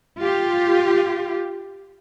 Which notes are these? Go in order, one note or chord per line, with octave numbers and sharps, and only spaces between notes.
F4 G4